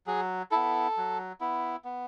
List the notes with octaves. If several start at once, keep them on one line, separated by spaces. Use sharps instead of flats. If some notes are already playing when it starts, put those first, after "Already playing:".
F#3 G#4
B3 E4 A4
F#3
B3 E4
B3